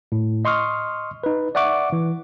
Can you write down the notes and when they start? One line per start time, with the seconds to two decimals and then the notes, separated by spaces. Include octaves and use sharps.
0.12 A2
0.45 D#5 C6 C#6 D#6 F6
1.24 D#4 B4
1.55 D5 E5 F#5 C#6 D6
1.92 E3